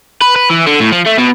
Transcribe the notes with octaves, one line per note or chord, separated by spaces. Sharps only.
B4
B4
E3
D3
A2
F3
A3
B2